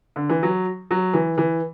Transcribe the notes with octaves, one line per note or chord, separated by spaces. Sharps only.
D3
E3
F#3
F#3
E3
E3